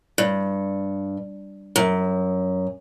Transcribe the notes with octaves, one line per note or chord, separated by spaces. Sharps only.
G2
F#2